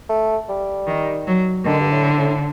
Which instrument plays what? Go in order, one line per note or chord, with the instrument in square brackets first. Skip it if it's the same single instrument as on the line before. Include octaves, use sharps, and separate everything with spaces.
[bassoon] A3
G3
[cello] D#3
F#3
[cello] D3 [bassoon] D#3
[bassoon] G2
A2
A2